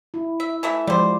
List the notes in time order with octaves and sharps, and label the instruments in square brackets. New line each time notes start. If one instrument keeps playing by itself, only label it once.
[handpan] E4
[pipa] E5
E3 A3 E5
[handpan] F3 G#3 D5 [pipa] G3 C5